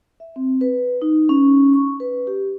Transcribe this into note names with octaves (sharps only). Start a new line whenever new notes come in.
E5
C4
B4
D#4
C#4
C#6
B4
G4